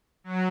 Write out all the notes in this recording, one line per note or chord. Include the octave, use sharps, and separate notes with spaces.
F#3